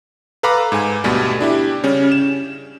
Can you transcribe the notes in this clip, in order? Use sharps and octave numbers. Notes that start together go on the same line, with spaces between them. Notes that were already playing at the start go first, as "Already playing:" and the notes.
A4 B4 F5 A#5 B5 D6
G#2 G#5
D2 B2 G3 A3
D4 E4 G4
C#3 G3 C#4
E7